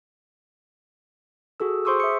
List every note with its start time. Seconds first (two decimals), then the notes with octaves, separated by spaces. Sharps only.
1.60 F#4 G#4 A4 E6
1.85 G#4 C5 C6 C#6 D#6 E6
2.00 E5 C#7